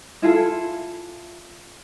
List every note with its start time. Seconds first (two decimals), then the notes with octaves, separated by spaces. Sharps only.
0.22 E4 F4 G#4 A4